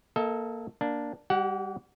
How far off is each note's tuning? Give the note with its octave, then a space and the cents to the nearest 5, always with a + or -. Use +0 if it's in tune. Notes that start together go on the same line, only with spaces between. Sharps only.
A#3 +0 A4 +0 D#5 +45
A#3 +10 D4 +0
G3 +15 G4 -40 F#5 +0